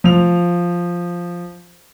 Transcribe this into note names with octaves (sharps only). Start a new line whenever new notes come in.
F3 F7